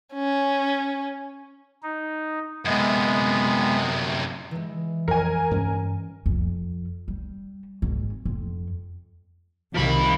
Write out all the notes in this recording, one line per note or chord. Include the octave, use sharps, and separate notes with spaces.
C#4
D#4
F#2 C3 G#3 B3
E3 G#3
F2 A#4 G#5
G2 C#4
F2
G3
G#1
F2
C2 C3 D#3 F3 B5